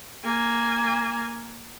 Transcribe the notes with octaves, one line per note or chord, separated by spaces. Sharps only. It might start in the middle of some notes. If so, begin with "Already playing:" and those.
A#3 G#5